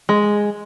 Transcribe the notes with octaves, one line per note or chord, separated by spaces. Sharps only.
G#3